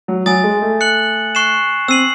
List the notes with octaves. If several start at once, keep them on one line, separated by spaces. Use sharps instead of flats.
F#3
F#3 G#5 D#6 A6
G#3
A3
F#6 C#7 F#7
C#6 F#6 C7 E7
C4 E6 C7 D#7 F#7